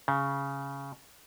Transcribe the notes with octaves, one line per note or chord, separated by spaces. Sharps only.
C#3